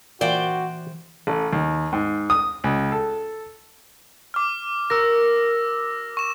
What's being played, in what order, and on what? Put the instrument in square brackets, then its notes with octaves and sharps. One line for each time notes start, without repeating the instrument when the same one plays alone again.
[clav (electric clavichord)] A#2 [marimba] E3 [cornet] F#4 [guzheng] C5 D5 G5
[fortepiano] A1
D#2
G#2
D#6
C#2
A4
[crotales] D6 F6
[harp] F#4 A#4 [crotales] E6 A#6
[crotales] C#6 E7